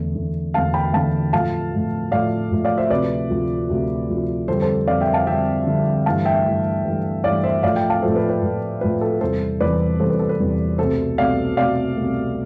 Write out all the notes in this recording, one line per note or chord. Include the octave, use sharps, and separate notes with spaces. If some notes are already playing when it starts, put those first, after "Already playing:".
Already playing: E2 D3 A3
E2 D3 A3
E2 D3 A3 F5 A5
G5 B5
E2 D3 A3 F5 A5
A2 F3 A3 F5 A5
A2 F3 A3
A2 F3 A3 D5 F5
A2 F3 A3
D5 F5
C5 E5
D2 C3 F3 A3 B4 D5
D2 C3 F3 A3
D2 C3 F3 A3
D2 C3 F3 A3
F2 D3 G3 A4 C5
A4 C5
F2 D3 G3 D5 F5
E5 G5
F5 A5
F2 D3 G3 E5 G5
F2 D3 G3
G2 E3 A3 F5 A5
E5 G5
G2 E3 A3
G2 E3 A3
G2 E3 A3 D5 F5
C5 E5
A2 F3 A3 D5 F5
E5 G5
F5 A5
A2 F3 A3 A4 C5
B4
B4
A2 F3 A3
A2 F3 A3 B4
A4
E2 C3 E3 G3 A4 C5
E2 C3 E3 G3 B4 D5
E2 C3 E3 G3 A4 C5
B4
A4
B4
E2 C3 E3 G3
C2 B2 A3 A4 C5
C2 B2 A3 D5 F5
C2 B2 A3 D5 F5
C2 B2 A3